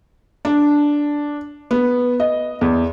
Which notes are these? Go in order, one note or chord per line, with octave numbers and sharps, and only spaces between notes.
D4
B3
D#5
E2